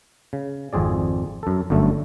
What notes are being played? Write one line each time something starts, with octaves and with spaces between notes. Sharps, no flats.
C#3
G#1 F2 C4 G#4 D5
F#2 A4
G1 F#2 D3 A3